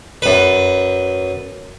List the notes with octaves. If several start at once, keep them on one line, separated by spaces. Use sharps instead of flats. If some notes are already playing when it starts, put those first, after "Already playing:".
F#2 B4